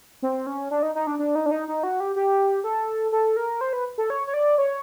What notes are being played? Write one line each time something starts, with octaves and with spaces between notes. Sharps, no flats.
C4
C#4
D4
D#4
D#4
D4
D4
D#4
D4
D#4
D#4
F#4
G4
G4
A4
A4
A#4
C5
B4
A4
C#5
C#5
D5
C#5